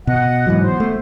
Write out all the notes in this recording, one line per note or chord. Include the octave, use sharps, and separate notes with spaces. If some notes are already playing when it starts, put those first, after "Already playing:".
B2 D#5 F#5
G#2 E3 F#3
B3 C5
A3